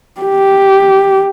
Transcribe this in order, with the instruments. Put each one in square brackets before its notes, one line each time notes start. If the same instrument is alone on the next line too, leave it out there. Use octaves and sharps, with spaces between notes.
[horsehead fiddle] G4